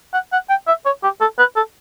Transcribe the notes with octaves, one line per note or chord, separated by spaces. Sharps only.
F#5
F#5
G5
E5
C#5
G4
A4
B4
A4